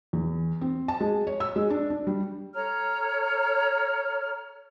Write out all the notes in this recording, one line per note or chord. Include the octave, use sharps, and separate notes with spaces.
E2
C4
A5
G#3
C#5
E6
G#3
D4
D4
G3
A4 C#5 A#5 F6